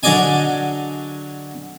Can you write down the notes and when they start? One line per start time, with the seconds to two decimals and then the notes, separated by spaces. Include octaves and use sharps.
0.03 D3 F#3 G#4 D5 D#5 G#5